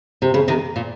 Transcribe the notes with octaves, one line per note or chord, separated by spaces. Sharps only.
C3
C#3
C3 D#3
A#2